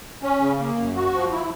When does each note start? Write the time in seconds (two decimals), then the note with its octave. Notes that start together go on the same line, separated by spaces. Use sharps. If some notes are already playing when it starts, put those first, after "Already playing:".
0.23 C#4
0.41 C#3
0.60 A#3
0.77 F#2
0.95 F#4
1.14 F3
1.32 E4